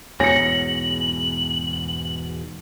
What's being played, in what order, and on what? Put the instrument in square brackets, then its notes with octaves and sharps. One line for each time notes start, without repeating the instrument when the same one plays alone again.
[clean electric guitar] E2 G#2 B2 [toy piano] C#5 G#5 [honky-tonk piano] A#6 C#7 [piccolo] F#7